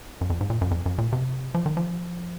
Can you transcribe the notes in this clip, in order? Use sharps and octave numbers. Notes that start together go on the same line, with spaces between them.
F#2
F2
G#2
A#2
F#2
F2
F#2
A#2
C3
F3
D#3
F3